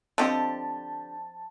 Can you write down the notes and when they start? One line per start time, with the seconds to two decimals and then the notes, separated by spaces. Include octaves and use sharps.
0.18 D3 F3 C4 G4 D#5 A5